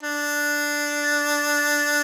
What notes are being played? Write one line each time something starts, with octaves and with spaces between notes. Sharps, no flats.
D4